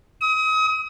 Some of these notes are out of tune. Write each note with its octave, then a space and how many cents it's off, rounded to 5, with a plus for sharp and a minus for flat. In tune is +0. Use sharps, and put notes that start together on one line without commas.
D#6 +35